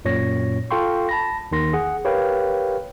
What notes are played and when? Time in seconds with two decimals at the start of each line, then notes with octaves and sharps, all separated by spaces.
0.05 F#2 A#2 C#5 A#6
0.71 F4 A4 F5 G5 C6 C#6
1.09 A5 B5 A#6
1.52 D#2 D#3 C6 A#6
1.73 G#4 F#5
2.05 G4 A#4 B4 C#5 F5 G5